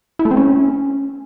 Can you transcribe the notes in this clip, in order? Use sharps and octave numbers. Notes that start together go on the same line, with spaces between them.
E4
A3
C4
C#4